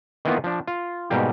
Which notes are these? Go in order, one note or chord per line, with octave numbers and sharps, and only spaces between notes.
D#3 E3 A#3 B3 F4
F3 D4
F4
G#2 B2 G3 A#3 G4